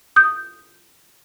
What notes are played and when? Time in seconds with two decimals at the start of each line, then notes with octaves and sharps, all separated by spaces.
0.16 D#6 G6